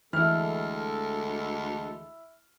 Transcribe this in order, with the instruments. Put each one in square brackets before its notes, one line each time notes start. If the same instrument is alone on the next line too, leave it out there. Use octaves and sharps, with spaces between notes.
[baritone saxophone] D2 [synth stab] E3 [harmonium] G#3 A4 [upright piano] E4 F6